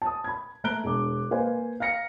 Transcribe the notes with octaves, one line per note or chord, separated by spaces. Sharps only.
A5 D#6
B5 G#6
A3 A#5 F#6 D7 G7
E1 D4 D6
A#3 B4 C5 F5 G#5
F5 A#5 F6 A#6 C#7